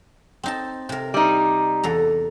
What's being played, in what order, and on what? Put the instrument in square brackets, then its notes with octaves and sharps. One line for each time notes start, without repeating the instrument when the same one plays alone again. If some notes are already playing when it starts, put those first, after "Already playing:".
[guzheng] C4 D#4 A5
C3 A#4
[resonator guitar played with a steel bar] G3 D#4
[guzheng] E2 A4 A#5